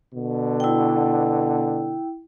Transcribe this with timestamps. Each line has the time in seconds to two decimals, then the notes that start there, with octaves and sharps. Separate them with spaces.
0.15 B2 D3
0.60 E4 G5